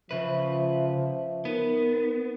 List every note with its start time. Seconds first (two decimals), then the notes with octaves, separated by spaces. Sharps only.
0.11 C#3 F3 B4 E5
1.45 B3 D#4 A#4